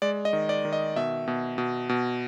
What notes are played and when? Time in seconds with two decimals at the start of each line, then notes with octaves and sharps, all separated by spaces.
0.02 G#3 D5
0.25 D#5
0.33 D#3
0.49 D5
0.65 D#3
0.73 D#5
0.96 B2 E5
1.28 B2
1.58 B2
1.89 B2